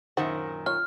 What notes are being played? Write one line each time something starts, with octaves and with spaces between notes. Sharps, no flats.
F#2 A#2 D#3 C5 F#5
F4 C#5 F6